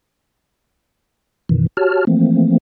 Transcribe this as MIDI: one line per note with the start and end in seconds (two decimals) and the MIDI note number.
1.49 1.67 42
1.49 1.67 47
1.49 1.67 51
1.49 1.67 52
1.77 2.05 66
1.77 2.05 67
1.77 2.05 73
1.77 2.05 81
1.77 2.05 89
2.07 2.58 52
2.07 2.58 53
2.07 2.58 57
2.07 2.58 58
2.07 2.58 60